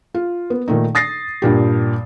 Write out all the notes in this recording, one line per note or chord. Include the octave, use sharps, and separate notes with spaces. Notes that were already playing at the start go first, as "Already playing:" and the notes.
F4
B3
A#2 D#3 A3 D#4
D#6 A6 A#6 C7
G2 A#2 G4